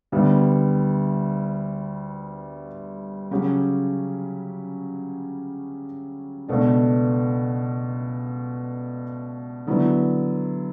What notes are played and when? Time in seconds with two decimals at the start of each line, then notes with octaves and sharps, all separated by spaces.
0.12 D2 D3 G3 B3
3.31 C#3 F#3 C#4 G4
6.48 C#2 B2 A3 D4
9.67 D3 F#3 B3 E4